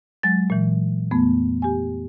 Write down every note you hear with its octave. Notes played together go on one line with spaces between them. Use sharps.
F#3 G#3 A6
A#2 E3
F2 A3 B3
G4 G#5